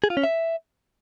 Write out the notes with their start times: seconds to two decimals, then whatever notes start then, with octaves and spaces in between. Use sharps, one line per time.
0.04 G#4
0.10 F4
0.17 C#4
0.24 E5